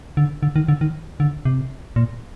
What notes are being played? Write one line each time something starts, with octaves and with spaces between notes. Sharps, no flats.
D3
D3
D#3
D3
D#3
D3
C3
A#2